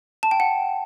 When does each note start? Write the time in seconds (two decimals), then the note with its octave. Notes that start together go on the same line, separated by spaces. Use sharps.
0.23 A5
0.31 G5
0.40 F#5